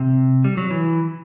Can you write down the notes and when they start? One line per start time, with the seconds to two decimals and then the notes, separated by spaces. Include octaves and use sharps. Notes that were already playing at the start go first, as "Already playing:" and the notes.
Already playing: C3
0.44 G3
0.57 F#3
0.71 E3